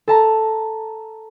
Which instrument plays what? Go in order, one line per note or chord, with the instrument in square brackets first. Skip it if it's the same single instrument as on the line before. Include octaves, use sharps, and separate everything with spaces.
[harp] A4 A5 A#5